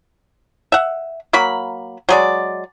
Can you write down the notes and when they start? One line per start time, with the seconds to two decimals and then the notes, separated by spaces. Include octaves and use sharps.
0.72 E5 F#5
1.33 F#3 A#3 B5
2.09 F#3 G#3 D5